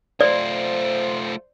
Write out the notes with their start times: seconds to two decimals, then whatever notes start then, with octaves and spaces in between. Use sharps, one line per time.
0.21 A3 F4 C5 D5